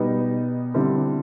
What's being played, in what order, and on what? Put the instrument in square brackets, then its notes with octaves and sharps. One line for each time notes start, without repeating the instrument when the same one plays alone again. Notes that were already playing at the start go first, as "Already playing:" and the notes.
Already playing: [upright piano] B2 G3 B3 D#4
D3 G3 C4 E4